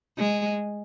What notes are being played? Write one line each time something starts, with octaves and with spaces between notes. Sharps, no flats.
G#3